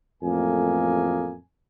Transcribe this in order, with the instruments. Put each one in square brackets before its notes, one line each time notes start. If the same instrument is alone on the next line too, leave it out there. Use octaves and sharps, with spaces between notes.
[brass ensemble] A1 F2 A3 A#3 G#4 G#5